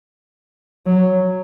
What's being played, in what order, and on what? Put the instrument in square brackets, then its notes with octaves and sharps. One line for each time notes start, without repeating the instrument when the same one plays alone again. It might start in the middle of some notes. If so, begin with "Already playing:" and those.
[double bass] F#3